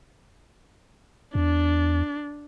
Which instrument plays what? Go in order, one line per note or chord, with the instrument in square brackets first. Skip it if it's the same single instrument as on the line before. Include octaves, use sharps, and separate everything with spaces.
[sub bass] E2 [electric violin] D4